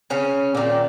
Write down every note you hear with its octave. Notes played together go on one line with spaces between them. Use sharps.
C#3 C#4
A#2 D#3